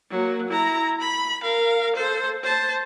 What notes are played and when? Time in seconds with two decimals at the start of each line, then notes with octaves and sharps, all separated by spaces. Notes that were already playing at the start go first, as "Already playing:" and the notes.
0.10 F#3 A#3
0.48 E4 A#5
1.01 B5
1.43 A#4 F5
1.96 A4 C5
2.43 C5 A5